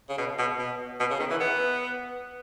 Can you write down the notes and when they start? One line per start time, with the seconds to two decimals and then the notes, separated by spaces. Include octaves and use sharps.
0.09 C#3
0.18 B2
0.39 B2
0.59 B2
1.00 B2
1.11 C#3
1.20 D#3
1.30 E3
1.40 B3